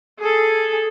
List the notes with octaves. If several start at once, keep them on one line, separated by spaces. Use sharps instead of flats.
G#4 A4